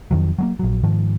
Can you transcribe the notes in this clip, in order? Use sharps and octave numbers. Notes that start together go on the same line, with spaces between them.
F2 D#3 F#3
F#3 G#3 A#3
A#1 F#3
G#2 D#3 F3